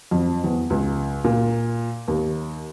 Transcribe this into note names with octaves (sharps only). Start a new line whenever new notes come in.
F2
E2
C#2
A#2
D#2